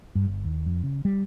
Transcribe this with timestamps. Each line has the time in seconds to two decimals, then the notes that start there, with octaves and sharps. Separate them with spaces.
0.15 G2
0.28 G1
0.45 D#2
0.66 F2
0.83 C#3
1.05 G3